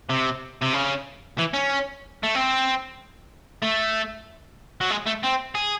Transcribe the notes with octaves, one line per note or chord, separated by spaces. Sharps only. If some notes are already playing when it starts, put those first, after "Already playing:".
C3
C3
C#3
E3
C#4
A3
C4
A3
F#3
G#3
A3
C4
G#4